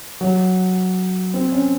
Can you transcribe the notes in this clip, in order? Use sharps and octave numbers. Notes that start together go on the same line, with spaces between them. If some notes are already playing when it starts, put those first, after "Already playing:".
F#3
C4
C#4